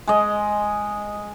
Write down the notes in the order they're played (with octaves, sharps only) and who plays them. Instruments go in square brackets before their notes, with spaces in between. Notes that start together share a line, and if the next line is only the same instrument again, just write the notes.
[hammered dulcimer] G#3 D#5